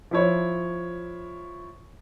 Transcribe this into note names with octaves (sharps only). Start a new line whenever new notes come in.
F3 E4 C#5